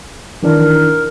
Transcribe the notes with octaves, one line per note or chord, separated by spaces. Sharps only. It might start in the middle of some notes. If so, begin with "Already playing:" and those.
D#3 E3 D4 A#4